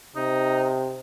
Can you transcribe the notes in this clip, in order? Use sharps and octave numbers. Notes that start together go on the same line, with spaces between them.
C3 D#4